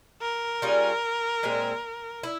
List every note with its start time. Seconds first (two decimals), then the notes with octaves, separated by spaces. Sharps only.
0.21 A#4
0.62 G3 C#4 F4 G#4
1.43 A#2 G#3 C4
2.23 E4